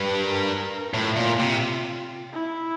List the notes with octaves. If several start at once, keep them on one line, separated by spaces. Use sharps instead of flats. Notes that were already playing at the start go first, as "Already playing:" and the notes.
Already playing: G2
A#4
A2 F4
A#2
C3
E4